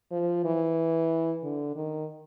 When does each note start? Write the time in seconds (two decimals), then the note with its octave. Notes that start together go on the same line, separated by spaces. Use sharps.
0.11 F3
0.45 E3
1.43 D3
1.76 D#3